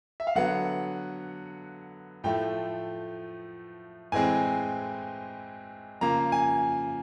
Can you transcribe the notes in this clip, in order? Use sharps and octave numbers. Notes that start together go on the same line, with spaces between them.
E5
F5
D3 F#3 B3 F#5
A2 F3 A3 G5
A2 E3 G#3 C4 G#5
C#3 F3 A#3 A#5
G#5